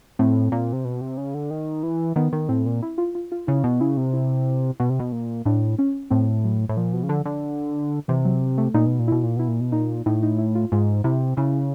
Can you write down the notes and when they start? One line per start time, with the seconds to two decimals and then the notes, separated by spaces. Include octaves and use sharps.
0.19 A2 C4
0.52 A#2
0.73 C3
0.85 B2
1.01 C3
1.17 C#3
1.34 D3
1.50 D#3
1.83 E3
2.16 D#3 B3
2.33 D#3
2.49 A2 C4
2.66 A#2
2.82 E4
2.98 F4
3.15 F4
3.32 F4
3.47 C#3 E4
3.64 B2
3.81 C#3 E4
3.97 C3
4.13 E4
4.80 B2
4.90 C3
4.99 B2
5.12 A#2
5.45 A2 D4
5.78 C#4
6.10 A2 C4
6.44 F#3
6.69 A2
6.77 A#2 F3
6.93 B2
7.03 C#3
7.09 D3
7.25 D3
8.08 C3 E3
8.25 F#3
8.58 A3
8.74 A#2 D#4
8.86 B2
8.99 A#2
9.08 B2 E4
9.23 A#2
9.37 B2 E4
9.48 A#2
9.60 B2
9.72 A#2 D#4
10.06 A2 D#4
10.23 D#4
10.38 E4
10.55 F4
10.72 G#2 F4
11.04 C3 E4
11.37 C#3 E4